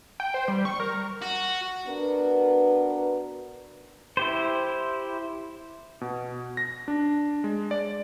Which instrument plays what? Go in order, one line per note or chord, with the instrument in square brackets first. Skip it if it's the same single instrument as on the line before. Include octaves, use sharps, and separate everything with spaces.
[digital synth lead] G5
C5
G3
C#6
A#4
[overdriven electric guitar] F#4
[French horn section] B3 D4 F#4 A#4 B4
[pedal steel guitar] E4 G4 C5
[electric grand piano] B2
A#6
D4
G#3
D5